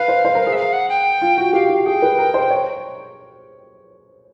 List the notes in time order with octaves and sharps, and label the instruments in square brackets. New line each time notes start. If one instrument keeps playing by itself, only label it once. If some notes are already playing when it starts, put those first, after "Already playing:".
Already playing: [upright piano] B4 [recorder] F5
[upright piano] C5
C5
A#4
G#4
[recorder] E5
F5
F#5
G5
[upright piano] F4
F#4
[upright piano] G4 [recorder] F5
[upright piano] G4
[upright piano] G#4 [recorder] G5
[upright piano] B4
A#4
C5
C#5